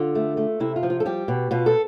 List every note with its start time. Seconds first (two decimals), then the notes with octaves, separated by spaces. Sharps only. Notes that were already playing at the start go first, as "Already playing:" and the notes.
Already playing: D3 F4
0.15 A3
0.37 A3
0.60 C3 E4
0.76 F4
0.83 F3
0.90 F4
1.00 A4
1.06 G3 G4
1.28 B2
1.51 B2 F4
1.66 A4